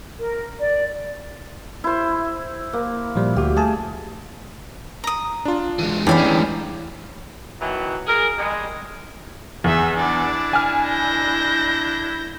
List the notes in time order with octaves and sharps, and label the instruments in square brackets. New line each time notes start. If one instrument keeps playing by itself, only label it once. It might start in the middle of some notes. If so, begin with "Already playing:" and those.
[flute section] A#4
D5
[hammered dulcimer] E4 C5
A#3
[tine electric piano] A#2 F3 G3
[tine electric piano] D2 F#4 [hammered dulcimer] G4
[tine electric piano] A3 A5 [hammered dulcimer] G#4
[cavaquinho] A#5 D#6
[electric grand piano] D4 F4
[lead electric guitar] E3 G#3
[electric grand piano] E2 C#5 [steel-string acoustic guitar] E3 C#4 D4 [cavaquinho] G4 F5 B5
[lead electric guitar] G3 G#3
[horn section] B2 D#3 E3 F#3
G#4 A#4
G3 G#3
[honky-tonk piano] E2 [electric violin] G#4 E5
[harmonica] D4 E4 [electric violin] D5
[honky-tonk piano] G#5 F6
[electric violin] G6 A#6